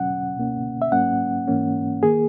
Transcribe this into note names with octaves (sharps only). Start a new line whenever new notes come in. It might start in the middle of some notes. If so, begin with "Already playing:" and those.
Already playing: E2 B2 F#3 C#4 F#5
C#2 B2 A#3 C#4
E5
G#2 F#3 A#3 C#4 F#5
G#2 E3 A#3 C#4
D#3 A#3 G#4